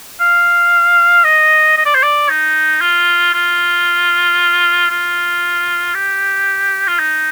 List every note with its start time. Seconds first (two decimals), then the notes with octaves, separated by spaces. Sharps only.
0.20 F5
1.24 D#5
1.77 D#5
1.86 D5
1.94 C5
2.03 D5
2.29 D#4
2.81 F4
3.34 F4
4.90 F4
5.94 G4
6.87 F4
6.99 D#4